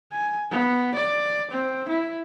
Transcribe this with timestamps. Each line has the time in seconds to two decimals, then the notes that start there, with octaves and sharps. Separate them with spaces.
0.12 G#5
0.51 B3
0.95 D5
1.51 C4
1.89 E4